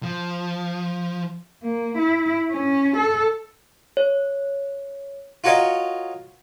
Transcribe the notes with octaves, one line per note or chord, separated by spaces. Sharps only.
F3
A#3
E4
C#4
A4
C#5
F4 F#4 A#4 C#5 D#5 F5